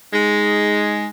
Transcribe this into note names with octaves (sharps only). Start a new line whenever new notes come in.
G#3 D#4